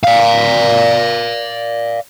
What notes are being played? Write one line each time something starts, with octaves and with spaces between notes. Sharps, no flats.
D5 F5